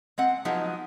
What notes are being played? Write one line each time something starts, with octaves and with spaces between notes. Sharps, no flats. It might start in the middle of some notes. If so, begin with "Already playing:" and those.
G#3 C4 F#5
F3 F#3 G#3 B3 D#4